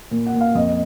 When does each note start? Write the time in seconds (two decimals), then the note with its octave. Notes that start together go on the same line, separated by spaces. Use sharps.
0.11 A#2
0.26 F#5
0.34 A#2
0.41 F5
0.55 F2 D#5